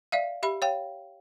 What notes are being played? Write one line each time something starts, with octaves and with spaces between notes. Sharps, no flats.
D5 E5 F5
G4 E5 B5
C#5 F5 G5